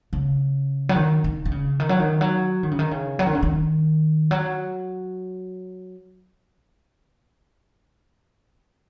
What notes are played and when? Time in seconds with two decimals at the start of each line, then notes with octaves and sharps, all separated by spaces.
0.13 C#3
0.89 F#3
0.96 D#3
1.24 D#3
1.45 D#3
1.52 C#3
1.80 D#3
1.89 F#3
2.00 D#3
2.21 F#3
2.63 D#3
2.71 C#3
2.79 D#3
2.91 C#3
3.19 F#3
3.27 D#3
3.35 C#3
3.43 D#3
4.31 F#3